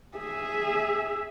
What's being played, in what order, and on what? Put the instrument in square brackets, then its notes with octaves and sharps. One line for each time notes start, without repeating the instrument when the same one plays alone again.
[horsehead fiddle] G#4 E5